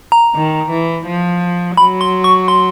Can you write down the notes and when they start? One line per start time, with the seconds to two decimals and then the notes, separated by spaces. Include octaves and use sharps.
0.12 A#5
0.35 D#3
0.70 E3
1.06 F3
1.77 F#3 B5
2.01 C6
2.24 C#6
2.48 C6